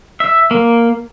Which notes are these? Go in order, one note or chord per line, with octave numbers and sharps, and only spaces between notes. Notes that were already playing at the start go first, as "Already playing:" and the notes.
E5
A#3